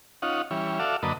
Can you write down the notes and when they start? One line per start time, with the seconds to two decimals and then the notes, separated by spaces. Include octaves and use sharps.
0.22 C#4 D#4 F4 F#5
0.51 E3 G3 C#4
0.79 F#4 A4 D5 E5 F5
1.03 F#2 D3 A#3 B4 D#5 A5